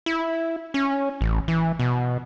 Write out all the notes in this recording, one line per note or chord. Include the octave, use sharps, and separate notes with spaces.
E4
C#4
A1
E3
B2